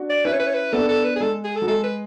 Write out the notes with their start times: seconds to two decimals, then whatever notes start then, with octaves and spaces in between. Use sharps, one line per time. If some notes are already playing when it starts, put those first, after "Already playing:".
Already playing: D4 F#4
0.10 D5
0.25 C#4 E4 B4
0.33 C#5
0.39 B4
0.47 C#5
0.54 B4
0.72 B3 D4 A4
0.89 A4
1.04 B4
1.16 G#4
1.20 G#3 A4
1.44 G#4
1.56 A4
1.62 F#3
1.67 G#3 A4
1.84 B4